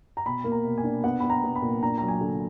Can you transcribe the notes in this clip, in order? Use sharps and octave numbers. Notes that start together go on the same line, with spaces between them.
A#5
B2 B5
A#3
A#5
B2
G#5
D4
B3 F#5
B3 B5
A#5
B3
B5
A#2
D4 A#5
F#3 A#5
G#5
D3